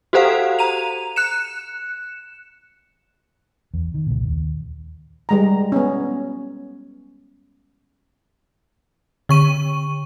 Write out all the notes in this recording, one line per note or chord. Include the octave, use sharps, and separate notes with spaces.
F#4 G4 A4 C5 F5 F#5
A#5 D#7 F7
F#6 C#7 E7
E2
D#3
C#2 A#2
D#2
G3 G#3 A#5
B3 C#4
D3 C#6 D#7